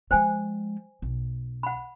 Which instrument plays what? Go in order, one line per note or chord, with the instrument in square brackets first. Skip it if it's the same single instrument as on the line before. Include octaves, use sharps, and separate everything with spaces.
[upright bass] F3 G#3 [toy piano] C5 G5 G#5
[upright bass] B1
[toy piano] F#5 B5